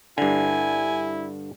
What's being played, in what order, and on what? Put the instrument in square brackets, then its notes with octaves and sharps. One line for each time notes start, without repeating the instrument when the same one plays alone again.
[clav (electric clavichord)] G2 D3 [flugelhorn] E4 [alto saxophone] G#5